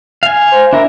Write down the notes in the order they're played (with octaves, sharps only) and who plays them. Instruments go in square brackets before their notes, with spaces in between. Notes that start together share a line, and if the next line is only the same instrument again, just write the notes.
[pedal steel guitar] F5 G#5
[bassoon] C5
[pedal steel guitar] D4 A#4 [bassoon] E4